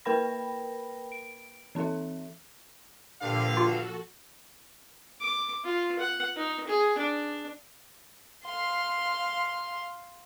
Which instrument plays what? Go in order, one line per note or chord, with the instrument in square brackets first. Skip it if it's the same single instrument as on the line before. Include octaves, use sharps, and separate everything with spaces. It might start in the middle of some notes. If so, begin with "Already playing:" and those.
[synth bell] A#3 A#4 B4 G5 B5 A#6
D7
E3 C4 D#4 A4 E5
[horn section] G2 D3 F5 [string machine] A#2 F3
[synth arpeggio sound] F4 [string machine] F#4 A4
[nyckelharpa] D6
F4
F#5
D#4
G#4
D4
[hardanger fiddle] F5 C6